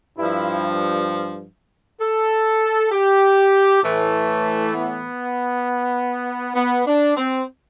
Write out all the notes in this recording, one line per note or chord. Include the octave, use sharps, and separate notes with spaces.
G2 F3 E4
A4
G4
A2 E3 A3
B3
B3
D4
C4